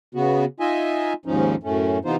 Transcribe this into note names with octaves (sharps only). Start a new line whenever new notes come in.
C#3 B3 F#4
D#4 F4 D#5 E5 G#5
D#2 G#2 F3 C#4 D#4
F#2 A2 A3 C#4
C3 E3 B3 D#4 F4 C5